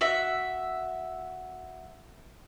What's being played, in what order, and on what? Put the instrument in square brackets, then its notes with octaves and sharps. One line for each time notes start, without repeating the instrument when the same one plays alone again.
[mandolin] F#4 E5